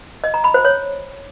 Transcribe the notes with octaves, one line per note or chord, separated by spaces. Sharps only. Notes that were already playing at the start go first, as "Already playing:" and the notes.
D#5
A#5
B5
C5
C#5